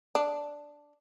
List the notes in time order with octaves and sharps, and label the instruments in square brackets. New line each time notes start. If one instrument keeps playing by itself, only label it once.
[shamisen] D4